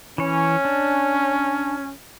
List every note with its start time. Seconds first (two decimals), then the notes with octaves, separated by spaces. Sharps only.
0.18 E3 C#4 C#5
0.65 D4